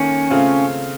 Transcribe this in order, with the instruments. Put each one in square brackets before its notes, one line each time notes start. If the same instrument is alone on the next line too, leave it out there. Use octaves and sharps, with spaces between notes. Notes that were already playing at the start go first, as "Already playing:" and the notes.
Already playing: [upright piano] D#3 A#3 A4 [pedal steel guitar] C#4
[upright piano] C#3 A3 C4 F4